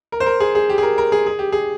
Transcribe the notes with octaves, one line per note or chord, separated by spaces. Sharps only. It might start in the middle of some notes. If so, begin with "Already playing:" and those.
A#4
C5
A#4
G#4
G#4
G4
G#4
A#4
A#4
G#4
G#4
G4
G#4